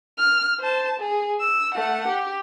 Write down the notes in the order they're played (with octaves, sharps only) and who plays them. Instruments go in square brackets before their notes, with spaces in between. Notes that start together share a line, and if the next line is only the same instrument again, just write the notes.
[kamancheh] F6
C5 A5
G#4
E6
A3 F#5
G4